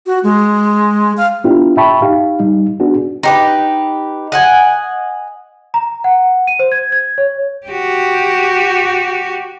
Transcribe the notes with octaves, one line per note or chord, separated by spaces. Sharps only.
F#4
G#3
F5
B3 D4 E4 F4 G4
E5 G5 A5 B5 C#6
D#4 G4 F5
G3 D#4
B3 D4 F#4 G#4
D#4 G4 B4
D#5 F#5 G#5
A#5
F#5
D#7
C5
G#6
G#6
C#5
F#4 G4